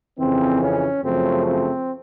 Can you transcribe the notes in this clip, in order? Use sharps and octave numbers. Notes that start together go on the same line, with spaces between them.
F2 C#3 E3 C4
C#4
F#2 C#3 F3 A3 C4
C4